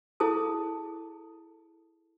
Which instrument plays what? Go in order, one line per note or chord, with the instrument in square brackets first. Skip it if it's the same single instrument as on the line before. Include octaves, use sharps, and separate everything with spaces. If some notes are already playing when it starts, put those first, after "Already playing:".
[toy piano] E4 G#4 A4 A5 D#6